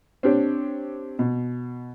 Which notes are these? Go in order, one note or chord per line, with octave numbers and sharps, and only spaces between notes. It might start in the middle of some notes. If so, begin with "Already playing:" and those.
C4 D4 G4 C#5
B2